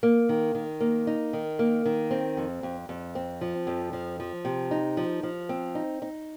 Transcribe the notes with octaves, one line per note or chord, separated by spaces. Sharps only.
A#3
D#3
D#3
A#3
D#4
D#3
A#3
D#3
C4
F2
F2
F2
C4
F3
F2
F3
F3
C3
D#4
F3
F3
C4
D#4
D#4